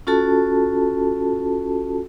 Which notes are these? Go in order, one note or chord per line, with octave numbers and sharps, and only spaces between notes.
C#4 F4 F#4 A4 A5